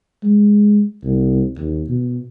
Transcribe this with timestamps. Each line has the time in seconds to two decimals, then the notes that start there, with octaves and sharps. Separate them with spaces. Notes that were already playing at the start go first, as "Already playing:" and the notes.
0.23 G#3
1.03 C2
1.58 D#2
1.89 B2